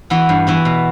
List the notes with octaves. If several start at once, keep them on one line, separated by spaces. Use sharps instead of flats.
E3 B3 F#4
G2
E3 B3 F#4
B2